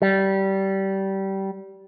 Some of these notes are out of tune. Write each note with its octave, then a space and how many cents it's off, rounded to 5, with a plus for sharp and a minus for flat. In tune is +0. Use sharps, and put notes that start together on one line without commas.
G3 -20